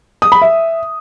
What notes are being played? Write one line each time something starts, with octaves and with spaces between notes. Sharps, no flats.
D#6
B5
E5